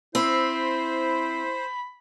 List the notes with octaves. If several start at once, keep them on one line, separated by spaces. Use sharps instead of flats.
C4 E4 C5 B5